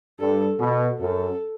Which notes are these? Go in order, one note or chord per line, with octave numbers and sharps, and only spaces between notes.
G2 A4
B2
F#2 A4